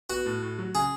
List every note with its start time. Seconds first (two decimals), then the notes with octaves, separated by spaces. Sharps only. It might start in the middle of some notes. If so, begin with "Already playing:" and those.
0.09 B3 F#4
0.26 A2
0.42 A2
0.59 F#3
0.75 C#3 G#4